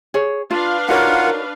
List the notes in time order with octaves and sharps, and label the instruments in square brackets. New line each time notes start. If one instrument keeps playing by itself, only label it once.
[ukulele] G#4 C#5
[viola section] D4 B4 F5 [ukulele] F4
[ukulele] D#4 F#4 C#5 [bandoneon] F4 F#5 [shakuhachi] A#4